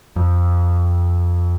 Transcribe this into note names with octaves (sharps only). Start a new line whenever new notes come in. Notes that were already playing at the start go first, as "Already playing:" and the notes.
F2